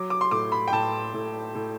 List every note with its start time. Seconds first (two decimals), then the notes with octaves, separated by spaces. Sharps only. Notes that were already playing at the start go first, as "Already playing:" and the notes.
Already playing: F#3 D6
0.10 D6
0.21 C6
0.31 A2 D6
0.52 B5
0.68 G5
0.72 A2 A5
1.14 A2
1.55 A2